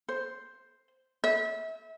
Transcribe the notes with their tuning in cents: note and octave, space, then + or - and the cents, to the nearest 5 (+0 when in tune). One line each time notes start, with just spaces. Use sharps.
C5 +0
E5 -30